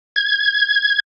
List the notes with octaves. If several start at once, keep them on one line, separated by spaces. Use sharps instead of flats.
G#6